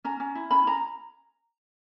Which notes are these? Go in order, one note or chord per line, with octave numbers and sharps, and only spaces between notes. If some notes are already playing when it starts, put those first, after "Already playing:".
C#4 A#5
C#4
E4
C#4 B5
C#4 A#5